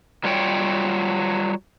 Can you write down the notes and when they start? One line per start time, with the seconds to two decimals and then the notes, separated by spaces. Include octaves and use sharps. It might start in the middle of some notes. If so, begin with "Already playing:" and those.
0.24 F#3 G3 F4 C#5 G5